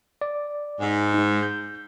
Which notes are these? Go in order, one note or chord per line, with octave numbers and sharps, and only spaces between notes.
D5
G#2
G#3 D#4
G6